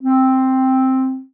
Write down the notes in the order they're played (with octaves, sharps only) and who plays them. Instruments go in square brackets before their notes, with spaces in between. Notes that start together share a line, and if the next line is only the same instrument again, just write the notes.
[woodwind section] C4